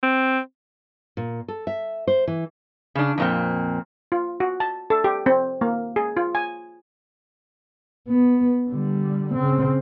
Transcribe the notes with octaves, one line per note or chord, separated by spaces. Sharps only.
C4
A#2
A4
E5
C5
E3
C#3 D4
F2 A#2 C4
F4
F#4
A5
A4
G4
C4
A#3
G#4
F4
G#5
B3
D3 G3
C#3 C4